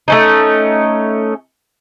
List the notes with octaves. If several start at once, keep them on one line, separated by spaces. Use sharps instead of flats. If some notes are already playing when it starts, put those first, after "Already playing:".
A3 C#4 D#4